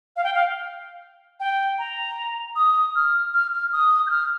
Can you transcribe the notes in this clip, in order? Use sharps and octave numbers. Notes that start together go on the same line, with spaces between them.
F5
G5
F5
G5
A#5
D#6
F6
F6
F6
D#6
G6
F6